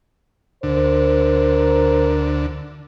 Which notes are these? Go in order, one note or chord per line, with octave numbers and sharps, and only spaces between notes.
D2 D3 A#4 C5